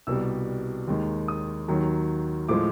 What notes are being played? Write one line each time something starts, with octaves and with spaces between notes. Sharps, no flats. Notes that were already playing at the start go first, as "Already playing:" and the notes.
C2 B2 G3 E6
D#2 D#3 G#3
D#6
D#2 D#3 F#3
A2 F3 G#3 D6